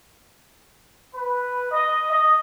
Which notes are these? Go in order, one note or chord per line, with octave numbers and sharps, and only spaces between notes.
B4
D#5
D#5